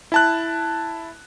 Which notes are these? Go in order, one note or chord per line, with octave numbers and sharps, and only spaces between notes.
E4 A5 F#6